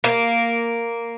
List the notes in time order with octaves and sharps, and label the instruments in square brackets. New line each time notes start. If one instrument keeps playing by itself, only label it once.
[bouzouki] A#3